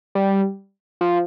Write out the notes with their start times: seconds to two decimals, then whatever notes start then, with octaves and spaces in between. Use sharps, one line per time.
0.15 G3
1.01 F3